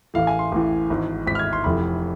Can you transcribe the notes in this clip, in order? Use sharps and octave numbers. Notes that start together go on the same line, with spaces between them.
A1 A2 E3 F5
G#5
C6
A1 A2 E3
G#1 G#2 E3
G#1 G#2 E3 B6
F6
G#6
C6
F1 F2 E3 B5